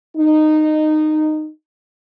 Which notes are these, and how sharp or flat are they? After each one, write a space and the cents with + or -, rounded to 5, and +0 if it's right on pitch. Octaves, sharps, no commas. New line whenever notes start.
D#4 -15